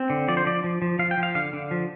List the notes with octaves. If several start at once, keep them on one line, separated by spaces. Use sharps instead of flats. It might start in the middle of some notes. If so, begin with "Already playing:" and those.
Already playing: C4
D3
F3 D5
C5
F3 D5
F3
F3
F3 F5
G5
F3
F5
D3 F5
D3
F3